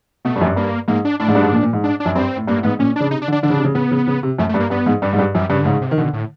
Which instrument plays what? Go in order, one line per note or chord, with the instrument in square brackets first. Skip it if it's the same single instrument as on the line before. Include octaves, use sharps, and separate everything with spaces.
[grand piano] B2 [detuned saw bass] A3
[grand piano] G2
F#2
G2
[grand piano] G2 [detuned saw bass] A#3
[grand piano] G#2 [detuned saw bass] A#3
[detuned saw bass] D4
[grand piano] A2 [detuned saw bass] D4
[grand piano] G#2
G2
G#2
A#2
A#2
G#2
[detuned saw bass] D4
D4
[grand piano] F#2
[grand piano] G2 [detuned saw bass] C4
[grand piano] A2
[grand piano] G2 [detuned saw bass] A#3
[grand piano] A2
[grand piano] G#2 [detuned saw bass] B3
[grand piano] A#2 [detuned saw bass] C#4
[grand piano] C#3 [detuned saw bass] D4
[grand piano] C3 [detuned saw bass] D#4
[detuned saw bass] D4
[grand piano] D3
[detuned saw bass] D4
[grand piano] D3 [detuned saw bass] D4
[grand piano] C#3
C3
C#3
[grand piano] C#3 [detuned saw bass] B3
[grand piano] C#3
C#3
C3
[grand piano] F#2 [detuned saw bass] A3
[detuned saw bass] A3
[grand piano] G2
[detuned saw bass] A#3
[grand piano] G2 [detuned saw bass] B3
[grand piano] G#2
[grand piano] G2 [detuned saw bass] G3
[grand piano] G#2
G2
[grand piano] F#2 [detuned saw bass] G3
[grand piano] G2 [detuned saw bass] C#3
[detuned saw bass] D3
[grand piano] G#2 [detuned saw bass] C#3
[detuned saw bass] C3
[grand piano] D#3
[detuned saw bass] B2 [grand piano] D3
[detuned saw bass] A2